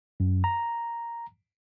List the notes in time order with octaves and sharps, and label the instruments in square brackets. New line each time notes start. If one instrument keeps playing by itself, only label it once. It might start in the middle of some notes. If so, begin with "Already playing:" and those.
[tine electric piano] F#2
A#5